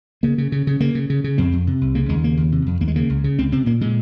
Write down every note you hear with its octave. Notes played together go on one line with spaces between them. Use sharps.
C#3 A#3
C#3
C#3
C#3
C#3 A#3
C#3
C#3
C#3
F2 C4
F2
C3
C2
C#3 A#3
D#2 G#3
C#3 A#3
D#2
C3
F2
D#2 A#3
G#3
C#3 A#3
C#2
C#3
C#2 C4
C3 C4
A#2 A#3
A#2 G#3